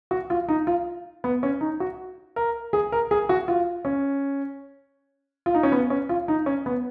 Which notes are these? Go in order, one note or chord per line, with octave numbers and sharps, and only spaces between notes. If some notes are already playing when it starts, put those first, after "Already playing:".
F#4
F4
D#4
F4
B3
C#4
D#4
F#4
A#4
G#4
A#4
G#4
F#4
F4
C#4
F4
D#4
C#4
B3
C#4
F4
D#4
C#4
B3